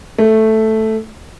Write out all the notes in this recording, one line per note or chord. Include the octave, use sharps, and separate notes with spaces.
A3